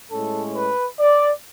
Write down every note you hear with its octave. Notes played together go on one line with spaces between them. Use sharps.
A2 G#3 C#4 A4
B4
D5